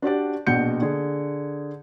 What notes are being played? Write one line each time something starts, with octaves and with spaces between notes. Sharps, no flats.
D4 F#4 G4 D5
A#1 B2 F#4 G6 C#7
D3 G#4